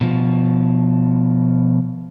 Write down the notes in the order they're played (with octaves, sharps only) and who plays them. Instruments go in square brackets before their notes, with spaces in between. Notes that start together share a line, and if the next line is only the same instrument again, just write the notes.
[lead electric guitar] B2 F3